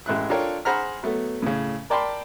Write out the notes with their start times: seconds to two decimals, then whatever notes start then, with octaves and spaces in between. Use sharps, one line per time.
0.06 A1 G#3 E4 F#6
0.30 D4 F4 A4 A#4 C#5 G5
0.65 G#4 C5 F#5 A#5 B5 F6
1.03 F#3 A3 B3
1.42 A2 C#3
1.90 A#4 D5 G5 A5 B5 C6